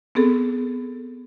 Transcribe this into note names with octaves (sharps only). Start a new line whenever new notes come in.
B3 C4 G#4 A4